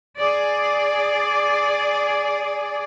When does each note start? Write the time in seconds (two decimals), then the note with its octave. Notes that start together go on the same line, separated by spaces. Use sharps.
0.18 G#4 D5